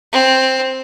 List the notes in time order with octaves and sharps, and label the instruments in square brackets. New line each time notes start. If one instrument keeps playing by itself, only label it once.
[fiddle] C4